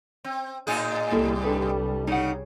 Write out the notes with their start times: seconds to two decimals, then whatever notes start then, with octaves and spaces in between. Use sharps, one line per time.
0.24 C4
0.67 A2 D#4 G#4
1.11 C2 G3 A#3 E4 A4
1.43 D4 A4 B4
2.07 C#3 D#4 F#5